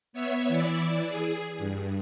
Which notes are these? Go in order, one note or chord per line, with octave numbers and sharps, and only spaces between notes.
B3 C#5 E5
E3 E4 D5
G#4
G2